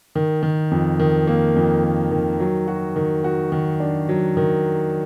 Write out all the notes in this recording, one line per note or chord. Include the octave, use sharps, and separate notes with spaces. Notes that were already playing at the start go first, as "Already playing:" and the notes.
D#3
D#3
F2
D#3
A#3
F2
D#3
D#3
F#3
F#4
D#3
F#4
D#3
D4
F#3
D#3